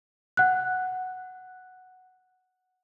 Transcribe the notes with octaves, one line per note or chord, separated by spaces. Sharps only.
F#5 F#6